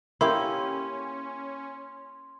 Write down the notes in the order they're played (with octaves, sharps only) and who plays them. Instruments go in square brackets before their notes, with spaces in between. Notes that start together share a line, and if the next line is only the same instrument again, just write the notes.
[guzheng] A#3 G4 [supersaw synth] C#4 [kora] E4 [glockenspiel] C6